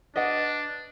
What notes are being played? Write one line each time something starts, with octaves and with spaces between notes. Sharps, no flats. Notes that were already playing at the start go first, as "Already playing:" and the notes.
D4 F#4 B4 D#5 F#5